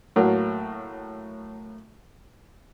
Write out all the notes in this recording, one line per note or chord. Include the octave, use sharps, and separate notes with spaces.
A2 F#3 A#3